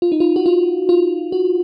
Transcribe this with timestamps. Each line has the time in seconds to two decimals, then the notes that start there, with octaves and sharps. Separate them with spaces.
0.02 F4
0.12 D#4
0.20 F4
0.36 F#4
0.46 F4
0.89 F4
1.32 F#4